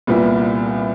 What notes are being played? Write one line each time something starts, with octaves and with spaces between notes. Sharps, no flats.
C2 A#2 G3 B3 E4